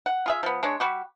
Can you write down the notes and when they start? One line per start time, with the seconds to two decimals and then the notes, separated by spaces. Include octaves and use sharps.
0.06 F#5
0.26 F4 G#4 E5
0.43 F3 B3
0.63 G#3 D4 C#5
0.80 G3 F#4 G4